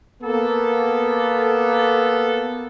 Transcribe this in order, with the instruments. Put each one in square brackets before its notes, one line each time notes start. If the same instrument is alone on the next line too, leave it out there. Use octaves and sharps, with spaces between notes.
[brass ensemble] A#3 B3 A4